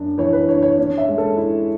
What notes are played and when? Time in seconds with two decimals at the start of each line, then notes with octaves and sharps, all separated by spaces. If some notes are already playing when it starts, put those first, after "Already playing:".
Already playing: F#2 D4
0.18 E3 C#5
0.33 B4
0.49 D4 C#5
0.62 C#5
0.78 C#4 C#5
0.98 E5
1.08 G#3
1.18 A4
1.37 E4